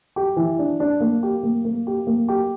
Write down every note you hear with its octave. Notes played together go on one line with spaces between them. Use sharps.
G4
E3
D4
D4
A#3
G4
A#3
A#3
G4
A#3
G4